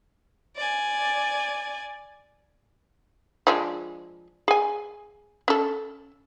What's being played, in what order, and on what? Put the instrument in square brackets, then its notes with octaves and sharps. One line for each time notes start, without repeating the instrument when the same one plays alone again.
[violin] D5 G#5
[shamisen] F3 G#3 D4
G#4 G#5
C#4 A4